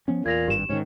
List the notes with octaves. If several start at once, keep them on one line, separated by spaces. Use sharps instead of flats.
F3 B3 C#4
E2 A#2 G#6 A#6 F7
G#1 G2 G4 E7
G#2 D3 D#3 C#4